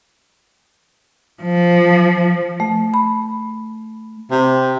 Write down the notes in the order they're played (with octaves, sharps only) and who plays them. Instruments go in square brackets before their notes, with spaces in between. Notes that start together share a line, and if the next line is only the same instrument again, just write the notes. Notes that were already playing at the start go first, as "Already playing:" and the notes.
[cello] F3
[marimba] A3
B5
[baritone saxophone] C3